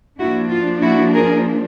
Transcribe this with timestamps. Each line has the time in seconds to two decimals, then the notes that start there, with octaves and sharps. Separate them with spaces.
0.19 F3 A#3 D4 E4 F#4
0.50 F4
0.81 E4 F#4
1.14 G#4 A#4